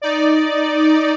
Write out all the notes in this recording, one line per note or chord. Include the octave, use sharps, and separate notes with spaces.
D#4 D5